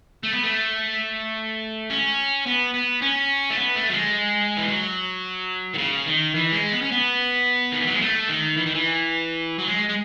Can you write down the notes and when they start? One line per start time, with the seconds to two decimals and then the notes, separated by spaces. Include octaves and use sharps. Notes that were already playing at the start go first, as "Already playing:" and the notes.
0.23 A3
0.33 B3
0.44 A3
1.90 C#4
2.46 B3
2.74 B3
3.02 C#4
3.50 A3
3.57 B3
3.76 A3
3.90 F#3
3.94 G#3
4.57 E3
4.68 F#3
5.74 D#3
5.78 C#3
6.06 D#3
6.35 E3
6.52 G#3
6.72 B3
6.81 C#4
6.92 B3
7.72 D#3
7.80 E3
7.87 F#3
7.93 G#3
8.01 A3
8.28 D#3
8.57 E3
8.65 D#3
8.74 E3
9.59 F#3
9.67 G#3
9.89 G#3